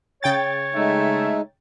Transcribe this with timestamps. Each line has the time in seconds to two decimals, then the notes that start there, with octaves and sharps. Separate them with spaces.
0.23 C#3 C#5 G5 A6
0.75 G#3 A3 D#4 E5